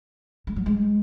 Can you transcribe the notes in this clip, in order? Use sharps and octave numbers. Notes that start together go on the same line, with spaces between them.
G#3
F#3
G#3